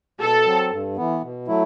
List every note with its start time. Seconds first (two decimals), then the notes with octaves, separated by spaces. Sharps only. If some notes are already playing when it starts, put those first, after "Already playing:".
0.20 B2 A4
0.46 F#3 C4
0.72 G2
0.97 E3 B3
1.23 B2
1.48 F#3 A3 E4